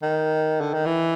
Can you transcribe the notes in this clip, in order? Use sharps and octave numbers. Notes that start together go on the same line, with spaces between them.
D#3
D3
D#3
E3